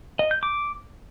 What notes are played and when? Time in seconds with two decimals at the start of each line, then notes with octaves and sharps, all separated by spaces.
0.19 D#5
0.31 G6
0.43 D6